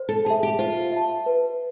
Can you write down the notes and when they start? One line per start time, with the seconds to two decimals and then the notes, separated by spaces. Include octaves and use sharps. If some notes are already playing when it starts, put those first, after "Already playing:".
Already playing: C5
0.09 A4
0.25 G#4 A5
0.30 E5
0.43 G4
0.59 F4 C5
0.92 E5 A5
1.26 B4